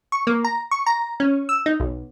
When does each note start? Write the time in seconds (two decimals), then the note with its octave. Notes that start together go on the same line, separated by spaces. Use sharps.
0.12 C#6
0.27 A#3
0.45 A#5
0.71 C#6
0.86 A#5
1.20 C#4
1.49 E6
1.66 D#4
1.80 B1